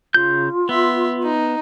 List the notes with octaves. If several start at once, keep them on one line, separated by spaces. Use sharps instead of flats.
C#3 F4 G6
B3 E5 C6
D#4